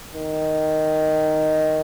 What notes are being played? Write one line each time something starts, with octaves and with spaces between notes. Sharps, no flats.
D#3